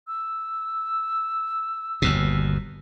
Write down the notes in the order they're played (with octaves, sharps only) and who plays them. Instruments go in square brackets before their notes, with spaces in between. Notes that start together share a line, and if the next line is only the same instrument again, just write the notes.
[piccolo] E6
[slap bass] G1 D#2 B2